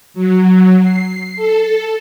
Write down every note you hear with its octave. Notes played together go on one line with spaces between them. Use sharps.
F#3
C7
A4